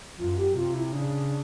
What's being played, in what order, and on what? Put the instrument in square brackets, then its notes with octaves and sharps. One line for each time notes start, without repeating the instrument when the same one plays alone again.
[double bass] F#2 [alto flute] F4
[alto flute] G4
[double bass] C3 [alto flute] F4
[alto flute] E4
[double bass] C#3 [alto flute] D4